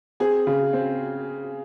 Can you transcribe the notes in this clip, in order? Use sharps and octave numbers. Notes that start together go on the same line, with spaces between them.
C4 G#4
C#3
C4